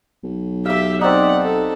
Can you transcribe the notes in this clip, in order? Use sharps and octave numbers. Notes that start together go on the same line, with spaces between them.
B1
G4 E5 F5 E6
C4 D#4 D5 F#5
A4